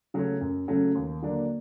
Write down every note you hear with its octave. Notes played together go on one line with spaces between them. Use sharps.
C#3 F#3 A3 C#4
F#2
C#3 F#3 A3 C#4
D#2
D3 F#3 A#3 D4